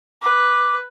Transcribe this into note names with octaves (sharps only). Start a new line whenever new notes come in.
B4 D6